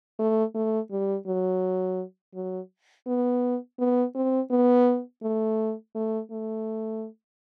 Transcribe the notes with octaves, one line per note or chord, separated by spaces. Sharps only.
A3
A3
G3
F#3
F#3
B3
B3
C4
B3
A3
A3
A3